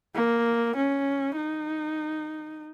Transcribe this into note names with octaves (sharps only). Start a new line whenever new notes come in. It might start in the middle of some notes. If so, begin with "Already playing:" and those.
A#3
C#4
D#4